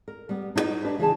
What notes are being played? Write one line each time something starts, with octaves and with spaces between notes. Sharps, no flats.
A#4
G3 B3
D#4 E4 F#4 G4 B4 D#5
D4 G4 B4
C#3 E3 G#4 A5